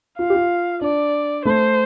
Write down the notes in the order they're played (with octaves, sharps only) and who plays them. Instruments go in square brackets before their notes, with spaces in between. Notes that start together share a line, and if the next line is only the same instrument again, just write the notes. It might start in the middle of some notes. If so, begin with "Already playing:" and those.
[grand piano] F4 [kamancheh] F5
[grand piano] G4
F4
[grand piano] D4 [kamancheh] D5
[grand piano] A3 [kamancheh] C5